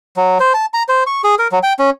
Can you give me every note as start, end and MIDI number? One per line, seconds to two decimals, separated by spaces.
0.17 0.38 54
0.40 0.53 72
0.54 0.66 81
0.74 0.83 82
0.88 1.04 72
1.07 1.22 85
1.24 1.35 68
1.39 1.48 70
1.52 1.59 54
1.63 1.73 79
1.79 1.90 61